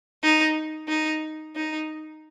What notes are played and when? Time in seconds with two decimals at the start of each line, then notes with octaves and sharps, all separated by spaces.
0.23 D#4
0.88 D#4
1.56 D#4